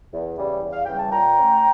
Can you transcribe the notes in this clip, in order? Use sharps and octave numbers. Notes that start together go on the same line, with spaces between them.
E2
C#3 E3 G3
E2
F5
C#3 E3 G3 G5
A5
A#2 G5 A#5
A3 C#4